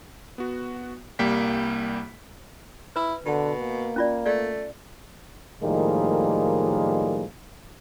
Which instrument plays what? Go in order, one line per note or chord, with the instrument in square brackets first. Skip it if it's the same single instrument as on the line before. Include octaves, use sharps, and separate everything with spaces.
[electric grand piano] B3 F#4
C2 G3 A#3 G5 B6
[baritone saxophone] E4 [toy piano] B4
[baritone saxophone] B2 [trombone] D3
[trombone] A#3
[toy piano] C#4 F4 D5
[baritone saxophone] A3 [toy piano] D5
[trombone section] A2 D#3 F3 G3 G#3 A#3